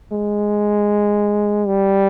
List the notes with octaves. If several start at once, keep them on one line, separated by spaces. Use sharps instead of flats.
G#3
G3